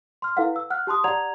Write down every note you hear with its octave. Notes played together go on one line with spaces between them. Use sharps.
C6 F6
E4 A4 B4 F5 F#5
E6
F#5 F6 F#6
G4 A5 C6 D#6
G4 D5 F#5 A#5 G#6 F7